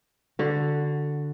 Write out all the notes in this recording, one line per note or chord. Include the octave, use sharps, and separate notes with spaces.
D3 F#4